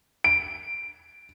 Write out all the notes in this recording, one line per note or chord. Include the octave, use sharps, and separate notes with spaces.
D7